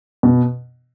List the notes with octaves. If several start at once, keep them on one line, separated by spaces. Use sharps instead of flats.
B2